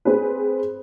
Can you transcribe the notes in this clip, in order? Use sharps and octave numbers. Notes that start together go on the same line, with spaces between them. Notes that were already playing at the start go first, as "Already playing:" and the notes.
C4 G#4 B4